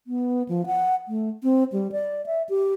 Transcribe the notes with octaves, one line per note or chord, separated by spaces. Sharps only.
B3
F3
F#5
A3
C4
G3
D5
E5
G4